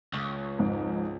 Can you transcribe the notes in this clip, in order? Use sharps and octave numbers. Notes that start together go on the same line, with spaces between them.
C#2 C#6
F2 G#2 C5